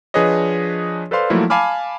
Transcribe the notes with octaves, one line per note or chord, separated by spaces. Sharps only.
F3 D4 G#4 B4 C#5 D#5
A4 B4 C5 D5 F5 C6
F3 F#3 A3 A#3 E4
F5 G#5 A5 B5 D6 F6